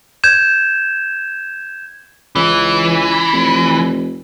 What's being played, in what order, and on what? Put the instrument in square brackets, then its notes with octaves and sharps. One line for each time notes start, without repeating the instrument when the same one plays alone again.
[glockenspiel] G6 G#6 E7
[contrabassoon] C#2 [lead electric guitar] E3
[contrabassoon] F1